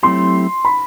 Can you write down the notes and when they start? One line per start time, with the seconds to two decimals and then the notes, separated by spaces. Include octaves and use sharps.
0.03 F#3 A3 C4 E4 G4 C6
0.65 B5